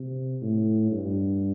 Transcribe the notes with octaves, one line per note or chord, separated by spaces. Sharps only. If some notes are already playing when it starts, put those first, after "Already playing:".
Already playing: C3
A2
G2